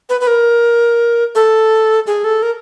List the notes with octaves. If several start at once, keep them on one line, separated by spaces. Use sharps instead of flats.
B4
B4
A#4
A4
G#4
A4
A#4